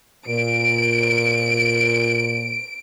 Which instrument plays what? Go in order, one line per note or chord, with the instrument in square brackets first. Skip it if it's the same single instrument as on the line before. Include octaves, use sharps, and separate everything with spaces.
[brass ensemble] A#2 [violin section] D7